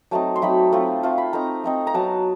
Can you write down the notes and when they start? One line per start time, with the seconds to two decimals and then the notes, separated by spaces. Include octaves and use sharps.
0.11 F#3 A3 C4 D#4 A5
0.36 C6
0.42 F#3 A3 C4 D#4 B5
0.72 A3 C4 F4
1.03 A3 C4 F4
1.18 B5
1.33 A3 C4 D#4 A#5
1.64 A3 C4 D#4
1.87 A#5
1.94 F#3 B3 D#4 A5